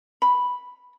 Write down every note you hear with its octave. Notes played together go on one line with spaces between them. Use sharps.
B5